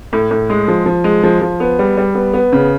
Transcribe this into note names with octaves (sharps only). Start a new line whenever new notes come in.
A2
A2
G#3
F3
F3
G#3
F3
F3
B3
G3
G3
B3
B3
C#3